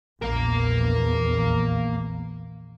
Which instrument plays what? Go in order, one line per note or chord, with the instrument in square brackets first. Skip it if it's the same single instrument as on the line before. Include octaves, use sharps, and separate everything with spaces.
[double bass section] A#1 E2 [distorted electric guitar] A#3 A#4